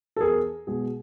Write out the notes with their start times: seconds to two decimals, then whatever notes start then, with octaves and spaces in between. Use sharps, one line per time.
0.16 A4
0.21 E2 G#4 A#4
0.67 B2 G#3 G#4